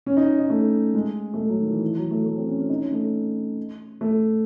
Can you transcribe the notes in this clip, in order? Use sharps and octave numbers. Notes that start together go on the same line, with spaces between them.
C#4
D#4
D#4
A3
G#3
A3
G#3
F#3
D#3
E3
E3
F#3
A3
A3
C4
C#4
C#4
D#4
C#4
A3
A3